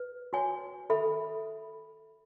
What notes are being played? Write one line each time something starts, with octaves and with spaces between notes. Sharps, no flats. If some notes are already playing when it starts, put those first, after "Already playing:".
Already playing: B4
F#4 C#5 G#5
A4 E5 B5